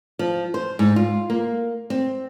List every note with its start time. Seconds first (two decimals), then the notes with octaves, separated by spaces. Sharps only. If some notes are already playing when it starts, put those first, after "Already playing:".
0.19 F3
0.54 C5
0.79 G#2
0.96 F4
1.30 A#3
1.90 C4